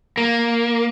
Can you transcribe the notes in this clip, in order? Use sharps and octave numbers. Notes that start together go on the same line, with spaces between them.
A#3